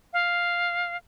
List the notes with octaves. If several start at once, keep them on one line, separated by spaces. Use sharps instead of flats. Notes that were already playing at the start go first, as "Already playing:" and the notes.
F5